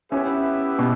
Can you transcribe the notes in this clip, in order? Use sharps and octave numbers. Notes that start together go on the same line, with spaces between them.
B3 C#4 E4 G4 B4 E5
B2